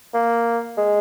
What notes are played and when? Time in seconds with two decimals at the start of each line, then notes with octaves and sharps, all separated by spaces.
0.14 A#3
0.78 G#3